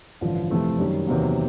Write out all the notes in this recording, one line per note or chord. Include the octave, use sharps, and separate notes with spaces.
A1 G2 D3 F3
F2 C3 E3 A3 C4
F#2 D#3 G3
E2 C3 D#3 F#3 A#3